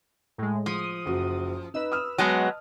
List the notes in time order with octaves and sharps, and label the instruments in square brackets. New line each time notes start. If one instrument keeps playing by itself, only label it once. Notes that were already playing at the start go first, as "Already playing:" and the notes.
[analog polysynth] A2 G#3
[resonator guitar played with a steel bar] F3 [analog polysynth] D#6
[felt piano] F#1 F#4
[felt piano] D#4 D#5 [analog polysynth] B4 E6
[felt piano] D#6 F6
[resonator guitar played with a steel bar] F#3 G#3 B3 [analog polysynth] D#5 [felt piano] A5